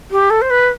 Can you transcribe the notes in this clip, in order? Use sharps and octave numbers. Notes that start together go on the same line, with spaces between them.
G4
A4
C5
B4